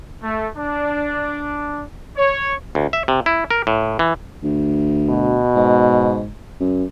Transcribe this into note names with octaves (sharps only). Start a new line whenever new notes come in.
A3
D4
C#5
D2
E5
C3
E4
A#4
A2
E3
D2
B2
G#2
F#2